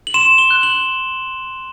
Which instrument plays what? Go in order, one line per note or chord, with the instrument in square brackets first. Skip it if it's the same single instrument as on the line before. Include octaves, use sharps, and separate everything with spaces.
[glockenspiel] F#7
C6 E7
G7
F#6
F#7